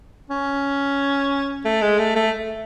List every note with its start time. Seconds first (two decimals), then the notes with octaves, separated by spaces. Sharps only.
0.30 C#4
1.65 A3
1.82 G#3
1.99 A3
2.16 A3